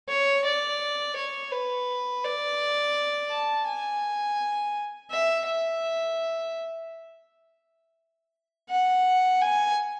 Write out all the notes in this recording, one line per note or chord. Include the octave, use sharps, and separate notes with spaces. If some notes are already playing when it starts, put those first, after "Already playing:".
C#5
D5
C#5
B4
D5
A5
G#5
E5
E5
F#5
G#5